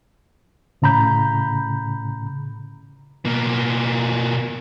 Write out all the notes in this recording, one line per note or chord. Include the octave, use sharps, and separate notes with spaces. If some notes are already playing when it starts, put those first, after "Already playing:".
A2 C#3 A#5 B5 G6
B2 A#3